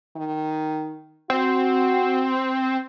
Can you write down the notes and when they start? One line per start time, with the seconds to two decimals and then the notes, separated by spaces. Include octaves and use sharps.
0.16 D#3
1.30 C4 F#4